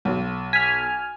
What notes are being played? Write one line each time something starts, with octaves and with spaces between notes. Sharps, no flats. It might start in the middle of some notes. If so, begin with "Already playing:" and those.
B1
G#5 F6 B6